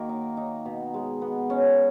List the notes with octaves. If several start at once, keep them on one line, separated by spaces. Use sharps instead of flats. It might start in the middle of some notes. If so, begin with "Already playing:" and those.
Already playing: D#3 A#3 F#4
D#4
D#4
B2
G#3
B3
C#4